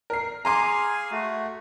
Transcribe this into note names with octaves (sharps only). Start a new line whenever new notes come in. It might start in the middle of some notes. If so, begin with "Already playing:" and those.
A#4 C7
G#4 F5 G#5 A#5 C6 D6
A3 F#4